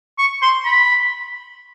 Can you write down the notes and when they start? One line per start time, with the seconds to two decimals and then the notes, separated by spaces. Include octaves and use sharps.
0.18 C#6
0.42 C6
0.65 B5